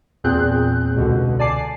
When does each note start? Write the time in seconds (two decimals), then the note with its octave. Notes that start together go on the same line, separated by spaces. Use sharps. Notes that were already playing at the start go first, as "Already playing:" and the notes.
0.24 E2 A#2 C4 G#4 F#6 G6
0.95 C#2 B2 D3
1.39 D5 G#5 A5 D6 C7